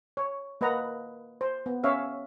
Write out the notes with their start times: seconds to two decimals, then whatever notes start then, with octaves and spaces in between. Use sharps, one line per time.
0.17 C#5
0.61 A#3 B4 D#5 F#5 A#5
1.41 C5
1.66 B3
1.84 C#4 C#5 E5 F5